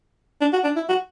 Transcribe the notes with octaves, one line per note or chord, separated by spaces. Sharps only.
D4
F#4
D4
E4
F#4